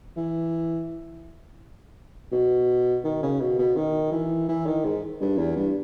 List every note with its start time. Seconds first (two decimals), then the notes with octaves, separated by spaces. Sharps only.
0.17 E3
2.32 B2
3.04 D#3
3.22 C#3
3.40 B2
3.59 B2
3.76 D#3
4.12 E3
4.48 E3
4.66 D#3
4.85 G#2
5.21 G2
5.38 E2
5.56 G2